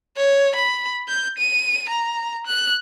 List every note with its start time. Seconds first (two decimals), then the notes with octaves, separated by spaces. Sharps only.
0.17 C#5
0.56 B5
1.08 G6
1.38 D#7
1.89 A#5
2.47 F#6